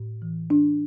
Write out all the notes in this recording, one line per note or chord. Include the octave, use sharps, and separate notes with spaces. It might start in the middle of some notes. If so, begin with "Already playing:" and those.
Already playing: A2
E3
D4